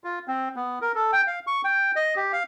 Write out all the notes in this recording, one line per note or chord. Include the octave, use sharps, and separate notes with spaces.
F4
C4
B3
A#4
A4
G5
F5
C#6
G5
D#5
G4
F5